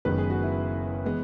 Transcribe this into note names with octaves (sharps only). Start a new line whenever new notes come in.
F#1 F#2 D#3 G#3 B3 B4
G#4
F#4
E4
E3 G#3 B3